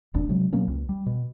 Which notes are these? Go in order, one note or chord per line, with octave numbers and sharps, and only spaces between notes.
D#1 G#1 D2 D4
C3 F#3 G#3
B2 F#3 A#3 C#4
C#2
G3
B2